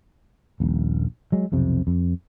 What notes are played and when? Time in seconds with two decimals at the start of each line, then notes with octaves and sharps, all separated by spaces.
0.60 D#1 A#1
1.32 F#3 G#3
1.52 B1 F2 C3
1.87 F2